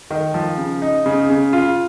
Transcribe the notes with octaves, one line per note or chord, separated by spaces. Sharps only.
D#3
F3
C#3
D#4
C#3
C#3
F4